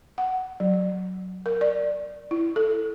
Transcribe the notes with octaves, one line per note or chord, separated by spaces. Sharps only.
F#5
F#3
A#4
D5
E4
A4